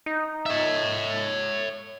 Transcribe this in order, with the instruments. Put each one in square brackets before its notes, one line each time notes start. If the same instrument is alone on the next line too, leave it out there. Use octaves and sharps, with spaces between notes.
[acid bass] D#4
[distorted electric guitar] C#5 E5